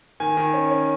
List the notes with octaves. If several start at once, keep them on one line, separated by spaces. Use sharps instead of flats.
D#3 G#5
D#3
C#4
C#4